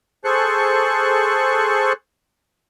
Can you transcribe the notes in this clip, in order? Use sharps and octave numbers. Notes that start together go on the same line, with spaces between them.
G#4 A4 C5 C#6 F#6